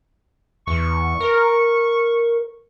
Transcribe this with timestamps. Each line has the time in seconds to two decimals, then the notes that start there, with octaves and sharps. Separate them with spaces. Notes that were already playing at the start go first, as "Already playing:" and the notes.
0.67 E2 C#6
1.20 A#4